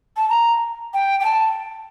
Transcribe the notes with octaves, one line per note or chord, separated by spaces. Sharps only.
A5
A#5
G5
G5
A5